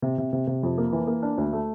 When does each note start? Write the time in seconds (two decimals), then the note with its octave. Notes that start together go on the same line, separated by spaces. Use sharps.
0.02 C3
0.18 C3
0.33 C3
0.47 C3
0.63 F2
0.78 A#3
0.92 E3
1.07 A#3
1.23 D4
1.38 D2
1.53 A3